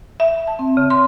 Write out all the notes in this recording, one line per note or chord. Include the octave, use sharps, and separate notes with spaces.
E5
A5
C4
C#3
C6